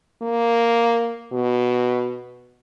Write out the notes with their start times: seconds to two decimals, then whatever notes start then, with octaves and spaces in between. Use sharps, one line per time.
0.22 A#3
1.32 B2